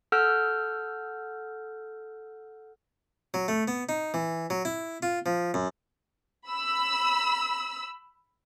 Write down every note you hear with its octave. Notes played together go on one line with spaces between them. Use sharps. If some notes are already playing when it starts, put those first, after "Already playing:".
A4 F#5 E6 F6 G6
F#3
A3
B3
D#4
E3
F#3
E4
F4
F3
F#2
B5 E6